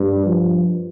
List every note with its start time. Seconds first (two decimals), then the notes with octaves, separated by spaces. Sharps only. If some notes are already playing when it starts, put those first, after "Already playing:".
Already playing: G2
0.26 F3